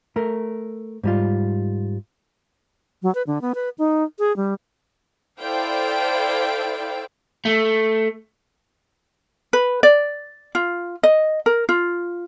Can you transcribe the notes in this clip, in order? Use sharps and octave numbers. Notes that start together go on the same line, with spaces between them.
A3 A#4
G#2 G3 F4
F#3
B4
D3
B3
B4
D#4
G#4
G3
E4 A4 C5 D5 F5 G5
A3
B4
D5
F4
D#5
A#4
F4